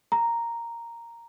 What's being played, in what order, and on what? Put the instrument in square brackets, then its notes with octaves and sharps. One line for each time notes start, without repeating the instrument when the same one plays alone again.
[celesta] A#5